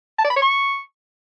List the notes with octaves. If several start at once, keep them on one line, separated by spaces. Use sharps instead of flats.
A5
D5
B5
C#5
C#6